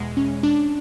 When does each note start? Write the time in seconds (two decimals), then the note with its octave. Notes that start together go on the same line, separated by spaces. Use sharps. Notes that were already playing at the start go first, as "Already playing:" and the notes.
Already playing: E2 B2 G#3
0.17 C#4
0.43 D4